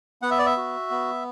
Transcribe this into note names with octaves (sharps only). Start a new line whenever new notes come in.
B3 F#5
E5
D5
E5
F#4
B3